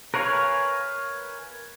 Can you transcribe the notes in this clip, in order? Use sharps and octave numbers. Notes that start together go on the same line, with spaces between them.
A#4 B4 C#5 F5 G#5